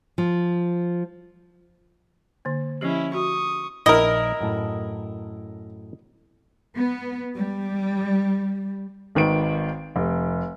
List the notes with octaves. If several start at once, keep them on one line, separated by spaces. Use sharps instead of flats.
F3
D3 A#3
F3 C#4 E4 G4
F#4 C#6 D#6
A#1 D#4 E4 A#4 D#5 G5
F#2 A2 A5
B3
G3
G#1 D#3 B4 D7
F1